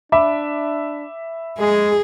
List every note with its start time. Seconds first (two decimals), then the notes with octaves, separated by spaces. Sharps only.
0.12 D4 E5 B5 D6
1.59 G#3 G#4